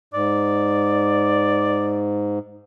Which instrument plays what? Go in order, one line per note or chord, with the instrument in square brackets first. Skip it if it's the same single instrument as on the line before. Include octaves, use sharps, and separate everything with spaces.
[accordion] G#2 [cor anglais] D5